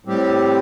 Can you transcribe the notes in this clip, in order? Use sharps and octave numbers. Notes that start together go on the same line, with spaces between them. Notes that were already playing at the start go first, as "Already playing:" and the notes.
A2 G3 C4 G4